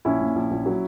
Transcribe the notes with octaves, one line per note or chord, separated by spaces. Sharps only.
A#1 C#4 E4
A#2
A#1
A#1
F#3